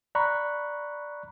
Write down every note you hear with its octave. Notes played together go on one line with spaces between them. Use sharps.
D5 A#5 B5 C#6 F#6